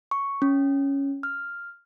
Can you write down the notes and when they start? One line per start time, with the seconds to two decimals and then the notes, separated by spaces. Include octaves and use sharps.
0.11 C#6
0.42 C#4
1.23 F6